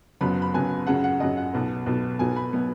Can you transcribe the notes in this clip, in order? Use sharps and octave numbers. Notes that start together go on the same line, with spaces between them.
F#1 F#2 F#3 B3 B5
B5
F#1 F#2 F#3 B3 G#5
F#2 C#3 F#3 F#5
F#5
F#2 C#3 F#3 D#5
F#5
B1 B2 B3
B1 B2 B3
B1 B2 F#3 B3 G#5
B5
B2 F#3 B3